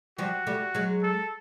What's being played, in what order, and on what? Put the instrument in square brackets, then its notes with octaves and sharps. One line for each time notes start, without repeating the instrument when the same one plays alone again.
[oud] F3 G3 [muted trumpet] F#4
[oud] G3 A3
F#3 G#3
[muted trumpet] A4